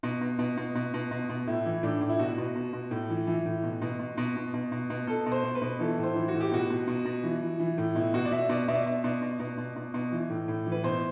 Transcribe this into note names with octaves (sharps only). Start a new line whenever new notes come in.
B2
B2
B2
B2
B2
B2
B2
B2
A2 E4
E3
A2 D4
A2
E4
B2 F#4
B2
B2
B2
A2
E3
E3
A2
B2
B2
B2
B2
B2
B2
B2
B2
B2 A4
B2
C5
B2
B4
B2
E3 A4
A2
C5
E3
F#4
A2
G4
B2 F#4
B2
B2
B2
E3
E3
E3
A2
B2 E4
B2 F#4
D5
B2 E5
B2 D5
B2 E5
D5
B2 E5
B2 D5
B2
B2
B2
B2
B2
E3
A2
A2
E3
B4
B2 C5